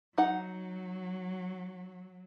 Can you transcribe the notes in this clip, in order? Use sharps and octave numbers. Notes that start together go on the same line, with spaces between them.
F#3 D#4 F#5